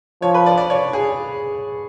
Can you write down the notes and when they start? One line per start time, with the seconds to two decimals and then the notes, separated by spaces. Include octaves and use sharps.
0.22 F3 C#5
0.34 B4
0.46 D5
0.57 D5
0.70 C#5
0.93 G#4